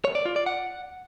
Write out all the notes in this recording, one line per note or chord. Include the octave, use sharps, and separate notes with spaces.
C#5
D5
F4
D5
F#5